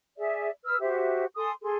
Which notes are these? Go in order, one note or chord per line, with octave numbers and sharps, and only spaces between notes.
G#4 D5 E5
B4 E6 F6
F#4 G4 C5 E5
A4 G#5 C6 D#6
G#4 A4 C6